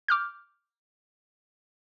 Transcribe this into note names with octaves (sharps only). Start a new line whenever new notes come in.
D6 F6 G6